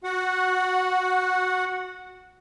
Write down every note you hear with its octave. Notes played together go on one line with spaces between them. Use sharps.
F#4 F#5